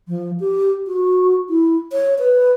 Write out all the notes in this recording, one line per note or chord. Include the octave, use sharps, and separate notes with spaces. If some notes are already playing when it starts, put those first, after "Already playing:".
F3
G4
F#4
E4
C#5
B4